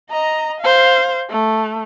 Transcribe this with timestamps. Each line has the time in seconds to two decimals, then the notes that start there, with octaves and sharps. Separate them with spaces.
0.10 D#5 A#5
0.61 C5 F5
1.30 A3